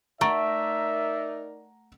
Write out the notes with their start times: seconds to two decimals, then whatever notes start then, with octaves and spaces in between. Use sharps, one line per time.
0.21 A3 D#4 A#4 D5 E5 F#5 A#5 D7